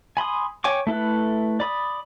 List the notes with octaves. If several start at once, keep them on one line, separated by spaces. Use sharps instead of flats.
G#5 B5 C6 D#6
C#5 G5 G#5 C#6 D6
A3 E4 A4 B4
D5 B5 D#6